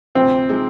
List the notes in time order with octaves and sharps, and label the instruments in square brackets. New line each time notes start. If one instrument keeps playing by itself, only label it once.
[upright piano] D2 C3 F3 [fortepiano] C4
[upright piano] C3 F3 G#3 D#4 G#4